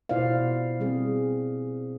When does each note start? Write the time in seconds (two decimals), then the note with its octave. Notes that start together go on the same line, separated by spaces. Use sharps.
0.09 B2 E4 C5 D5 F5
0.80 G3 C4 G#4